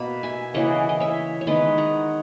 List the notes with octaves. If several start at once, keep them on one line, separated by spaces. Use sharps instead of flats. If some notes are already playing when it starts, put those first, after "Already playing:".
Already playing: B2 A#3 B5
E5 G#5
C#3 E3 A#3 D#5 F#5
D#5
C#5 E5
C#5
D#3 G#3 B3 B4 D#5
F#5 A#5